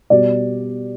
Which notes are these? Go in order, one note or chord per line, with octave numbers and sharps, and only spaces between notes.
B2 G3 D5